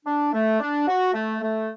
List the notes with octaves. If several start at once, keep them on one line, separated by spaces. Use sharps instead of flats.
D4
A3
D4
F#4
A3
A3